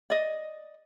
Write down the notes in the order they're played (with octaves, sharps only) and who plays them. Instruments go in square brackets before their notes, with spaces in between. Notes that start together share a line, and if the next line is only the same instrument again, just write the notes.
[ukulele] D5 D#5